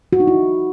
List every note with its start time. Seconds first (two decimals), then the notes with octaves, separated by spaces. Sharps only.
0.13 F#4
0.20 D#4
0.27 E4